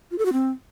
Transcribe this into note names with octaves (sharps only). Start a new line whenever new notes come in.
F4
A4
F#4
C4